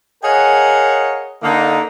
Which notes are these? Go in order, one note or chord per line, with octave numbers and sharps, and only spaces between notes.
G#4 A#4 C#5 D#5 F5 F#5
D3 A#3 D#4